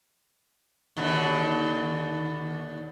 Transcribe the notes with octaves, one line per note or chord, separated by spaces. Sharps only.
D#2 B2 D3